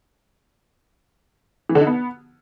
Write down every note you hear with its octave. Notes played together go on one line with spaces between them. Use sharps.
E3
D3
D#4
B3